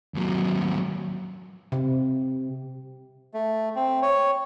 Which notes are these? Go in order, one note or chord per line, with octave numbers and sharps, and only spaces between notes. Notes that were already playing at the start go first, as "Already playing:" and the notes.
D#2 F#3
C3
A3
C4
C#5